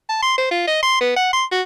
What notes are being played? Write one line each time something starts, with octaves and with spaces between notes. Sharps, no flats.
A5
C6
C5
F4
D#5
C6
B3
F#5
C6
F#4